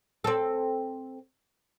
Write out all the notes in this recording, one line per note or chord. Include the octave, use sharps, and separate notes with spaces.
C4 A4